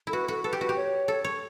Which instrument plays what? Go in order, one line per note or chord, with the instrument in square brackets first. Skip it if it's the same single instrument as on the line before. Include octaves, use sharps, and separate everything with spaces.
[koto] E4 [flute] A4
[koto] F#4 [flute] B4
[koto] F#4 [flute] A4
[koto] A4 [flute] B4
[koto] G4
[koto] F#4 [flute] B4
[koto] G4
[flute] C#5
[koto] A4
C#5